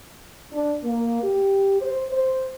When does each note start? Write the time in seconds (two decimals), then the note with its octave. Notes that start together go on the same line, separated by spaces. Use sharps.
0.53 D4
0.84 A#3
1.23 G4
1.81 C5
2.12 C5